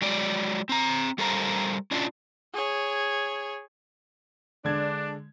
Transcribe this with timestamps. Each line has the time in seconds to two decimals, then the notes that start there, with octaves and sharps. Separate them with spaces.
0.02 F#3 G#3 D5
0.69 C4 A#5
1.18 G3 A4 A#4 C5 F5 A#5
1.91 C#4 D4 F4
2.54 G#4 C#5
4.65 D3 G#3 D4 G#6